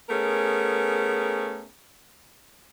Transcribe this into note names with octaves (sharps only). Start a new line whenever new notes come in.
A3 B3 C#4 G#4 A#4